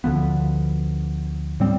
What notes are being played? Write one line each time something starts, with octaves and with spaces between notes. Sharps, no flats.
D2 D3 F3 B3
A2 G3 C4